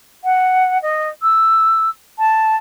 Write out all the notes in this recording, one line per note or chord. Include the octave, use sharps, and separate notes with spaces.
F#5
D#5
E6
A5